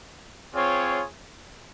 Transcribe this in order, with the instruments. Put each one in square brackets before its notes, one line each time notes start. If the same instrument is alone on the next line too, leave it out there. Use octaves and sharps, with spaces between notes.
[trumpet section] C4 F4 G#4 C#5